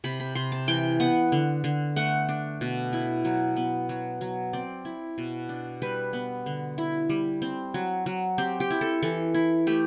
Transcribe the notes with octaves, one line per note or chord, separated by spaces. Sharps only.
C3 B5
B5
C3 C6
A5
E3 G5
B3 F#5
D3
D3
A3 F#5
D4
B2
E4
F#3
B3
F#3
F#3
C4 D5
E4
B2
D4
G3 B4
B3
D3
E4
G3
C4
F#3
F#3
C4 G4
G4
E4
A4
E3 A4
E4
A3 G4